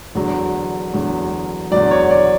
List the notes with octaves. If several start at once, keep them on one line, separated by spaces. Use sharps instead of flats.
E2 D3 F#3
E2 D3 F#3
E2 D3 F#3 D5
C#5
D5